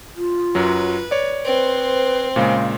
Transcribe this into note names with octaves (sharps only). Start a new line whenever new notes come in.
F4
F#2 F#3 B4
C#5 D5
C4 B4 C5
A#2 C#3 G#3 F5